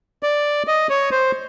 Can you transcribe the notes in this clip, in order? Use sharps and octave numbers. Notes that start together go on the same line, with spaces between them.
D5
D#5
C#5
C5